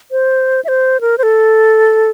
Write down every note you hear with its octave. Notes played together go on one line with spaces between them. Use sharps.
C5
E5
C5
A#4
C5
A4